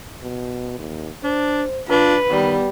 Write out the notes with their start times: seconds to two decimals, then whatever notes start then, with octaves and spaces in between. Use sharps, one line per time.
0.23 B2
0.79 D#2
1.23 D4 C5
1.89 D4 F4 B4
2.31 D#3 G3 B3